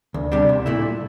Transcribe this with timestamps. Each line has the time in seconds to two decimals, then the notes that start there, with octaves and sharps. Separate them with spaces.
0.14 D2
0.32 C3 G3 D4 G4
0.49 C2
0.66 A#2 A3 E4